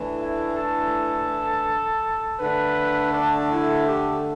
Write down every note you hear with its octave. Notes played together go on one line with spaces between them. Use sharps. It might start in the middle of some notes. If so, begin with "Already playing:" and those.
Already playing: A2 E3 A3 D4
E4
A4
D3 A3 D4 B4
D4
E4
G4